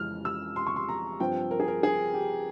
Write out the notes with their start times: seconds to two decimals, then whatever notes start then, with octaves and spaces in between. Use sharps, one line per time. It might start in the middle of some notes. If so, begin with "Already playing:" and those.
Already playing: F2 C#3 E3 G#3 C#4 F6
0.25 E6
0.56 C6
0.67 C#6
0.76 C6
0.89 A#5
1.20 G2 F3 C4 G5
1.51 A#4
1.60 G#4
1.68 A#4
1.83 G#4
2.14 G4